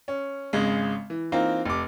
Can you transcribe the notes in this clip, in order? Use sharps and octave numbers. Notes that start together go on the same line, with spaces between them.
C#4
G#1 C#3 G#3
E3
E3 A#3 C4 D#4 F4
F1 D6